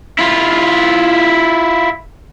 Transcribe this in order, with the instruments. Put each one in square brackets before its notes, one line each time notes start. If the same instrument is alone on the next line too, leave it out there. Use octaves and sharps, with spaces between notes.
[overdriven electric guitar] E4 F4